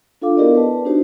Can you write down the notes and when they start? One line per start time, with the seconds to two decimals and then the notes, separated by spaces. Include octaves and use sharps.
0.22 D4 F4 A4 F5 D6
0.37 B3 E4 G4 A#4 D5 D#5
0.56 B4 A5
0.85 D4 D#4 F#4 G4 C5